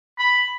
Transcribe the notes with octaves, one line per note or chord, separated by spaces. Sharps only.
B5